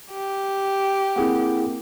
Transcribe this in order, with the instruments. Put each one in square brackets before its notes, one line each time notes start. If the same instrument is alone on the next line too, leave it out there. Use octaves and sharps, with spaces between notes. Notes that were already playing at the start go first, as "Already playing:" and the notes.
[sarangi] G4
[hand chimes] A#3 C4 A#4 [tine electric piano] E4 G#4 F#5